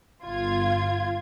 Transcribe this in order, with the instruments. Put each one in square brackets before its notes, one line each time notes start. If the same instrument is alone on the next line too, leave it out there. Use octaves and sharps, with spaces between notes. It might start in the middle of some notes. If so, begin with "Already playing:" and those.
[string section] G1 F4 G#6